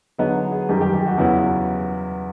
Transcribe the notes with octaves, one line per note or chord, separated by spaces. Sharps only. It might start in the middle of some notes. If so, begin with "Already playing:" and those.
D3 F#3 B3 D#4 G#4
G#4
F#2 D#3 G3 G4
G4
G4
F#4
E2 C#3 F#3 B3 E4 F#4